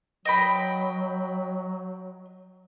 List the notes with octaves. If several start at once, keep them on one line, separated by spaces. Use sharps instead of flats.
F#3 D#5 G5 B5